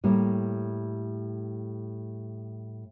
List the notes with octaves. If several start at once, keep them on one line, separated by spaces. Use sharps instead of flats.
A2 G3 A#3